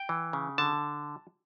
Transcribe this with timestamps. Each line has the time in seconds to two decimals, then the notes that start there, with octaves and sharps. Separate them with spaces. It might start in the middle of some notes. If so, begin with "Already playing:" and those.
Already playing: G5
0.09 E3
0.33 C#3
0.58 D3 A5